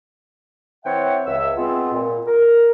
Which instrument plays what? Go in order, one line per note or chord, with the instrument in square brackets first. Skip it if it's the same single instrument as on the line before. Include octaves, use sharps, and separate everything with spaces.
[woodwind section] E3 C4 C#5 E5 F#5 G5
C#2 E5 E6
G#3 B3 C4 F4
A#2
A#4